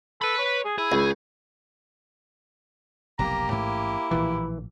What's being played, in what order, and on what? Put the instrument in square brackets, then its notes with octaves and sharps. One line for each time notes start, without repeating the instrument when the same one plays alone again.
[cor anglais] A4 [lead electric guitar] B4 B5
[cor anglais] C#5
G#4
[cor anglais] E4 [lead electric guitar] G#4
[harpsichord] C#2
[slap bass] F1 B1 F2 [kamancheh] A#3 G4 [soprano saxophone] A#5
[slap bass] A1 G#2 A3 [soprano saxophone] E4
[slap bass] A#1 A2 F3 [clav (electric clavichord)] E3